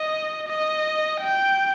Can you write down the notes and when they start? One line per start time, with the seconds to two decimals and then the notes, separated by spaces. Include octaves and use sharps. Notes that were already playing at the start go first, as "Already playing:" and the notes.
Already playing: D#5
0.48 D#5
1.21 G5